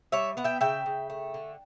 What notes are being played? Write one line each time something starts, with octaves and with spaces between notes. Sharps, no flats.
G3 C#5 E5
B3 F#5
E5 G5
C#3 E5 G5
C#3
A3
D3